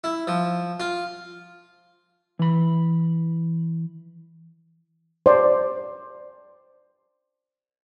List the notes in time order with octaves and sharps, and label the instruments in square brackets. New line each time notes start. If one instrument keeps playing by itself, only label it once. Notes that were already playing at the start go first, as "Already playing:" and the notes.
[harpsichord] E4
F3
F4
[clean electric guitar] E3 B5
[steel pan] C5 D5